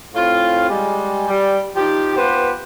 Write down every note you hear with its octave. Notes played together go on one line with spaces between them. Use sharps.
A2 C4 F4
G3 G#3
G3
F3 D#4 G4
B3 F4 G4 B4 C5